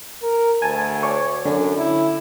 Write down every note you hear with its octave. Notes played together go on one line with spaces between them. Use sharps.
A#4
D2 G#5 A5
C#5 D5
F#2 D3 C#4 D4
E4